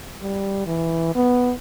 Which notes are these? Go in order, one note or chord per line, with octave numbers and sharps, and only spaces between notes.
G3
E3
B3